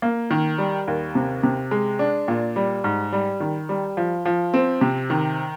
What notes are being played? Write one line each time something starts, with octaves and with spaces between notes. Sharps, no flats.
A#3
D#3
G3
D#2
C3
C3
G#3
D4
A#2
G3
G#2
G3
D#3
G3
F3
F3
C4
C3
D#3